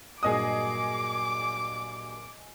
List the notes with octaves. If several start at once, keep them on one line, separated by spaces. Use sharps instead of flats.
G2 A#2 F#3 G#4 D#5 D6 D#6